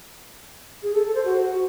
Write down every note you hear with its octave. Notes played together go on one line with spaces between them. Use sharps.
G#4
A4
A4
C5
F#4